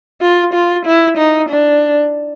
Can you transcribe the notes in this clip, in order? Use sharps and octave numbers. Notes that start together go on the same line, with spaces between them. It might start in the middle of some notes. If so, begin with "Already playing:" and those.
F4
F4
E4
D#4
D4